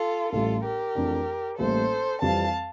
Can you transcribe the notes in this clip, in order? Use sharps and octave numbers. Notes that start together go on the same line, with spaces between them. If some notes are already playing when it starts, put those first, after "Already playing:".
Already playing: F4 A4
A1 A2 G3 F4 A4
G4 A#4
F2 E3 A3 D4
A1 A2 G3 A#3 A4 C5
F2 E3 G3 C4 F5 A5